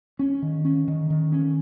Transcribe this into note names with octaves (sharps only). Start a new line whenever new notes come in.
C#4
D#3
C#4
D#3
D#3
C#4